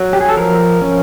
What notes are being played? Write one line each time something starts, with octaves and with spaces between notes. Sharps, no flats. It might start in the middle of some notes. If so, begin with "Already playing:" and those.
Already playing: F#3
G4
G#4
A4
F3 A#4
C#4